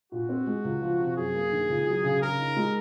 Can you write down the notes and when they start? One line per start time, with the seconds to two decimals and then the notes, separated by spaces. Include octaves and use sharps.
0.12 A#2 F#4
0.29 C4
0.47 G#3
0.64 C#2
0.81 F3
0.99 C3
1.16 F#2 G#4
1.34 A#3
1.52 D#3
1.69 C#2
1.87 F#3
2.04 C#3
2.22 C#3 A#4
2.39 D#4
2.57 G#3